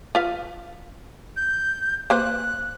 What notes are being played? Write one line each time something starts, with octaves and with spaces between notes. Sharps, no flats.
F4 B4 F5
G6
A#3 B4 C5 F#6